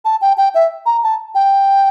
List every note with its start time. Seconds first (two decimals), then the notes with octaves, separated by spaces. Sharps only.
0.05 A5
0.21 G5
0.37 G5
0.55 E5
0.86 A#5
1.03 A5
1.35 G5